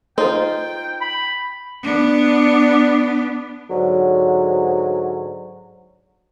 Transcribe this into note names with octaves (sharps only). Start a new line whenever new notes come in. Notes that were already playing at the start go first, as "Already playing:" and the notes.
D#4 F4 C5 G5
B5
B3 D4
G#2 D3 F#3